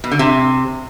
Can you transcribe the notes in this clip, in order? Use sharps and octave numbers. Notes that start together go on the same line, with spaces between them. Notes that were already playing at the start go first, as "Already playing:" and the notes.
B2
D3
C3